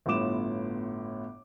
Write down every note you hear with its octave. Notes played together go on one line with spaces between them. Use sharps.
G1 A2 B3 F4 D6 E7